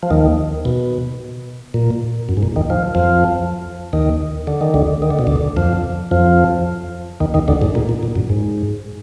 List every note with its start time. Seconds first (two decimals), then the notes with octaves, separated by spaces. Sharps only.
0.03 F3
0.11 D#2 D#3
0.65 B2
1.74 A#2
2.29 F#2
2.37 G#2
2.43 A#2
2.56 D#2 D#3
2.70 F3
2.95 F2 F3
3.93 D#2 D#3
4.47 D3
4.61 D#3
4.74 D2 D3
5.02 D#3
5.11 D3
5.19 B2
5.27 D2 D3
5.57 F2 F3
6.11 F2 F3
7.20 D#2 D#3
7.34 D#2 D#3
7.48 D2 D3
7.62 G#2
7.75 A#2
7.89 A#2
8.03 A#2
8.15 F#2
8.30 G#2